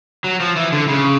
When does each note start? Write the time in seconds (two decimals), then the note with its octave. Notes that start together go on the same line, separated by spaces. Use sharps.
0.24 F#3
0.40 F3
0.56 E3
0.72 D3
0.88 C#3